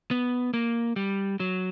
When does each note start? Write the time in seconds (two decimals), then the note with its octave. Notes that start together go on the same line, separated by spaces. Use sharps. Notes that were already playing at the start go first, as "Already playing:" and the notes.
0.11 B3
0.54 A#3
0.96 G3
1.40 F#3